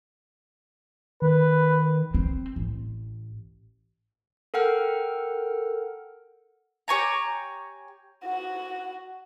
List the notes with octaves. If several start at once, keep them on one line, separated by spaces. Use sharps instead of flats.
D#3 B4
C4
A1
A4 A#4 F#5 G5 F6
G4 C#5 G#5 A#5
F#4